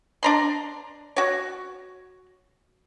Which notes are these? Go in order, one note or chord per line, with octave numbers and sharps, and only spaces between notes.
D4 A#5 C6
F#4 C#5